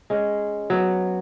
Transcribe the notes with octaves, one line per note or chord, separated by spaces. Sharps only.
G#3 C#4
F#3 B3